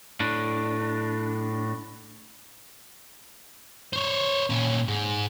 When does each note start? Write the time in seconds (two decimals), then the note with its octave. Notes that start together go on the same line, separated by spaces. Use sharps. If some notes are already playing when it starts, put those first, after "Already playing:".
0.20 A2 D4
3.93 C5 C#5
4.50 A#2 C#4
4.88 G#2